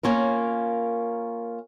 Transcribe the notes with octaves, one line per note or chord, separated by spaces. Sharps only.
A#3 C#4 F4 A#4